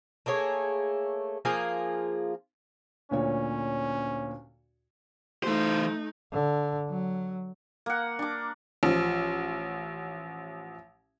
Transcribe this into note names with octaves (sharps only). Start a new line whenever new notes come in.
A3 A#3 G#4 C#5
F3 A#3 F4 G#4
D2 A#2 C#4 C#5
E3 A3 D#4 C5
D3
F#3
A#3 F#5
D4 D6
A1 F3